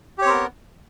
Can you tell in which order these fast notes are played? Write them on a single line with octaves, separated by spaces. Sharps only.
G4 C#5 C4 A#4 B3